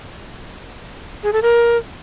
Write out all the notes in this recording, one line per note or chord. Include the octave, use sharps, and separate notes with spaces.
G#4
A4
A#4